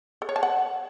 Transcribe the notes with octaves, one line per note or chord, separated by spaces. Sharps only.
A4
C#5
A5
F#5